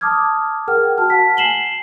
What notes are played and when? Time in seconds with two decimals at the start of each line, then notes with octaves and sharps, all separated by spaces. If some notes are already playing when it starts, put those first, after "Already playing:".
0.01 A5 D6 D#6 F6 G#6
0.68 G#4 A#4 F#5 G5 F6
0.98 F#4 A5 F6
1.10 F#5 A5 B6
1.37 G#5 C7 E7 F#7 G7